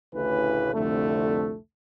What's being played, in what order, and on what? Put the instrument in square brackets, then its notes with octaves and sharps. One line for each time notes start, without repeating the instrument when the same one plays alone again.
[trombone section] A1 D2 A2 C#3 E3 B4
C2 F2 D3 A3